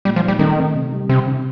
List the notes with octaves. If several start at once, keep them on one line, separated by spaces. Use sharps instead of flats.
A#2 G3
F3
D#4
G3
D#3 A3
C4
C3
G3
C3 C4
C3